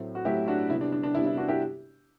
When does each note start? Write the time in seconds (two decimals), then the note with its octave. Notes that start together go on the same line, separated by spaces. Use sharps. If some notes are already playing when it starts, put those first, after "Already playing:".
Already playing: A2 F#3 A3 C4
0.15 F#4
0.25 A2 F#3 A3 C4 E4 G4
0.48 D4 F#4
0.70 C3 G3 B3 E4
0.81 D4
0.92 D4
1.03 D4
1.14 C3 G3 B3 E4
1.26 E4
1.37 D4 F#4
1.48 E4 G4